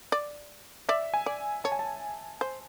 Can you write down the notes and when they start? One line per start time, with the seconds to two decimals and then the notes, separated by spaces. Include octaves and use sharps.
0.12 D5
0.89 D5 E5
1.14 G#5
1.26 D5
1.64 C#5 A5
1.72 G#5
1.79 A5
2.41 C5